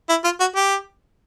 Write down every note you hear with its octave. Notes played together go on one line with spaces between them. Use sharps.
E4
F4
F#4
G4